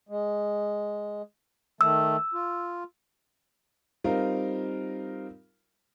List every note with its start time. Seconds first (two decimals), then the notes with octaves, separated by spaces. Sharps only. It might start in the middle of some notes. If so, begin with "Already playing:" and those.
0.09 G#3
1.81 D#3 A3 E6
2.34 F4
4.04 G3 C4 D#4 F4 A#4 F5